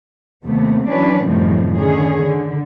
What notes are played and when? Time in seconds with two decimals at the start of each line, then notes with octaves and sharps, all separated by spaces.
0.45 D#2 C3 A3 B3
0.88 E3 F#3 C#4 D4 B4
1.25 F#2 A2 C3 D#3 F3 G3
1.76 D3 D#3 C#4 G#4
2.23 D3